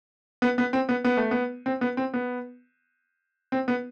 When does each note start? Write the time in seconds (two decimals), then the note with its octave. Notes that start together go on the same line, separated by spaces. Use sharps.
0.42 B3
0.58 B3
0.73 C4
0.89 B3
1.04 B3
1.17 A3
1.31 B3
1.66 C4
1.81 B3
1.97 C4
2.14 B3
3.52 C4
3.68 B3